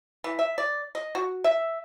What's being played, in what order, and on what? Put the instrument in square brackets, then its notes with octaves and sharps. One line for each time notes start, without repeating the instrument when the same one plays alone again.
[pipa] E3
E5
D5
D#5
F#4
E5